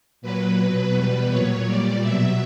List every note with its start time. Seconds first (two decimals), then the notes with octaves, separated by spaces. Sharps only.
0.21 A#2 F#3 B4
0.57 B2 F#3
0.94 E2 B2 G3
1.29 A#2 F#3 C#5
1.65 A#2 G3 D5
2.01 B2 F#3 E5